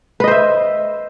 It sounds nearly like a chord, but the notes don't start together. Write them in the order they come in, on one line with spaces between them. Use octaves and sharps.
B4 D#5 C5 E5